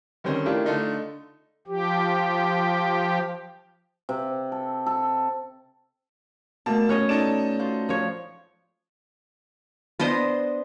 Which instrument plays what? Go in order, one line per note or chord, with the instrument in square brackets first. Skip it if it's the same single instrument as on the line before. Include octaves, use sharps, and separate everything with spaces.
[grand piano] D3 D#3 G3 C4 C#4
A3 D4 E4 F4 G4 A#4
D3 A3 D4 D#4 F4
[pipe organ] F3 G4
[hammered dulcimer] C3
A4
A4
[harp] B2 A3 [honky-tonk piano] A#3 A5
[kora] C#4 C#5 D#5 [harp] F#6
[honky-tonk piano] D#4 A4 E7 [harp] D5
[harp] F4 F#4 C5
[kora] F3 C#5
[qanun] B3 D4 C5 D#5